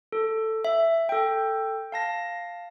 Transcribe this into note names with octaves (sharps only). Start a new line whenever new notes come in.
A4
E5
A4 G5
F5 A5 A#6